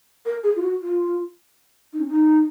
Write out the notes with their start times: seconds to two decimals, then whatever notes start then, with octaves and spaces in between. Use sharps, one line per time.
0.26 A#4
0.44 G#4
0.56 F4
0.62 F#4
0.81 F4
1.93 D#4
2.00 C#4
2.08 D#4